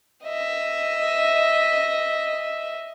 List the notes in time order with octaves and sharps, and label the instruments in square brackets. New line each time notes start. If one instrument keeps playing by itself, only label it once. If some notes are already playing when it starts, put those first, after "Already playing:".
[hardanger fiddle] D#5 E5